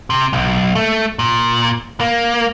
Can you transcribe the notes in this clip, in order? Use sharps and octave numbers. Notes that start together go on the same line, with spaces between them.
C3
B1
A3
A#2
A#3